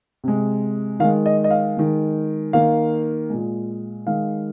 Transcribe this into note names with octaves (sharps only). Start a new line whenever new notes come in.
C3 G#3
D#3 G#3 F5
D#5
D#5
F5
D#3 G#3
D#3 A#3 F5
A#2 G#3
D#3 G#3 F5